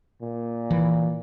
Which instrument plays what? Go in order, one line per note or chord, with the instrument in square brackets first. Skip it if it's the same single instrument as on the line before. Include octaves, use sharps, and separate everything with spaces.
[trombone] A#2
[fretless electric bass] E3